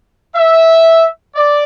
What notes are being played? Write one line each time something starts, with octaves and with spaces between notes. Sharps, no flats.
E5
D5